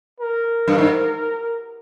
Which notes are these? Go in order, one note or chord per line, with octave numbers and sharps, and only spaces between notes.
A#4
G2
G#2